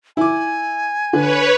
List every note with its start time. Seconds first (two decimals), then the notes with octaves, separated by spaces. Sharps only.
0.17 E4 G#5 D6
1.13 D3 B4 C#5